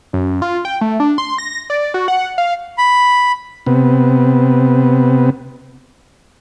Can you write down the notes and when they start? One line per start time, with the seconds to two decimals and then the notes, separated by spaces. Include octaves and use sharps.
0.13 F#2
0.42 F4
0.65 G5
0.81 A3
1.00 D4
1.18 C6
1.38 A#6
1.70 D5
1.94 F#4
2.08 F#5
2.38 F5
2.78 B5
3.66 C3 B3